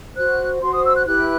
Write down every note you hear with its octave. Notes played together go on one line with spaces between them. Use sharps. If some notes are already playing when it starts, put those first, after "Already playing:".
F#4 C5 F#6
F#4 C5 C6
D#6
E6
F#6
E4 G4 B4 F#6